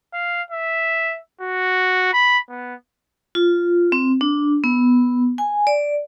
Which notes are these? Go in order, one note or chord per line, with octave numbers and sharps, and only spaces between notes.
F5
E5
F#4
B5
B3
F4
C4
D4
B3
G#5
D5